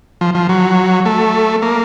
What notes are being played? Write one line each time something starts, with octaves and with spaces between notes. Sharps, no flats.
F3
F3
F#3
A3
A#3